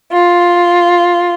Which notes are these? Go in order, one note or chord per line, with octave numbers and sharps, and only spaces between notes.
F4